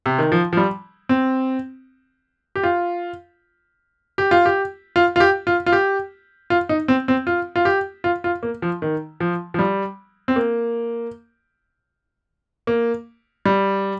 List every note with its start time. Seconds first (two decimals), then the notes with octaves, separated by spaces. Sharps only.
0.06 C3
0.18 D#3
0.32 F3
0.53 F3
0.57 G3
1.09 C4
2.55 G4
2.63 F4
4.18 G4
4.31 F4
4.46 G4
4.96 F4
5.16 F4
5.20 G4
5.47 F4
5.66 F4
5.73 G4
6.50 F4
6.69 D#4
6.88 C4
7.08 C4
7.27 F4
7.56 F4
7.65 G4
8.04 F4
8.24 F4
8.43 A#3
8.62 F3
8.82 D#3
9.20 F3
9.54 F3
9.59 G3
10.28 C4
10.36 A#3
12.67 A#3
13.45 G3